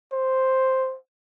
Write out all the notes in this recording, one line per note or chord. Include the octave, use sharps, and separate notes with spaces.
C5